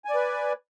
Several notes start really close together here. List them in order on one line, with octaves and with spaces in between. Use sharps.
G#5 D5 B4